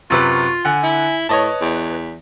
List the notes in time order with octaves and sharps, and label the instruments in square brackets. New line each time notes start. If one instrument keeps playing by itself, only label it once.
[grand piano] F#2 C3 B4 [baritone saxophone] F4 [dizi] C#6
[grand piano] D3 F#5 [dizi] G#5
[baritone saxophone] E4
[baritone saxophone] A2 [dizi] B4 [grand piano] C#5 D#5 A5
[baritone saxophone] E2